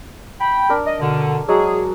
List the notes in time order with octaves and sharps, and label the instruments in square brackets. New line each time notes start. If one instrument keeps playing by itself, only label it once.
[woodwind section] G5 B5
[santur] D4 A#4
[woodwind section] D#5
B2 D3
[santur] F#3 G#3 [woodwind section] G#4